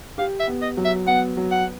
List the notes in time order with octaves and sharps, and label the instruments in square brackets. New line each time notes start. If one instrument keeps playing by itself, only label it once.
[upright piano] G4 [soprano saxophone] F5
[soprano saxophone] E5
[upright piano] B3
[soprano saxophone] D#5
[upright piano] F#3
[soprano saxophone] E5
[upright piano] B3 [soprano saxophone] F#5
[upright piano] F#3
[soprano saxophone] F#5